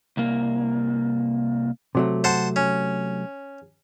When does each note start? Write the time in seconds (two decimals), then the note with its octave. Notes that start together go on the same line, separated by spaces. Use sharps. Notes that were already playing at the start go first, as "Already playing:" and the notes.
0.17 C2 A#3
1.95 C3 F#3 A3
2.24 C5 F#5 A5
2.56 C#4